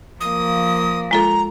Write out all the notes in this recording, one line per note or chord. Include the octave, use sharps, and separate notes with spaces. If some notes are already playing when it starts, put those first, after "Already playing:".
F3 A#3 D#6
G#3 F4 A4 A#5